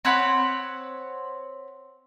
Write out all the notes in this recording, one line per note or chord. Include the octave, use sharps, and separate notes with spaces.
C4 C#5 F#5 B5